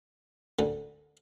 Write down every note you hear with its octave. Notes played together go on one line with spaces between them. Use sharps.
D2 D3